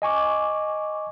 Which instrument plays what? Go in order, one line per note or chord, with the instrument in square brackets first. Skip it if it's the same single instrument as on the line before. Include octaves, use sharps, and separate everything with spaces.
[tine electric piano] D#5 G#5 C#6 D6